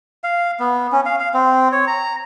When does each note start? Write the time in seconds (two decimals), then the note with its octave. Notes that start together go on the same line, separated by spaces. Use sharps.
0.24 F5
0.60 B3
0.92 C#4
1.06 F5
1.20 F5
1.34 C4
1.72 C#5
1.87 A#5